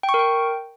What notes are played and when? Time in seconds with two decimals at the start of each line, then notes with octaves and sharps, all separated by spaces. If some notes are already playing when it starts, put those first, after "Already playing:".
0.03 G5
0.09 C#6
0.14 A#4
0.19 G5